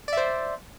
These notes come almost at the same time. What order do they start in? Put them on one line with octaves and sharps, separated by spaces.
D5 E5 C5